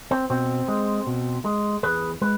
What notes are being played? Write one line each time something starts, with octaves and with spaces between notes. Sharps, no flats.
C4
B2 C4
G#3
B2
G#3
E2 G#4 B4
G#3 B4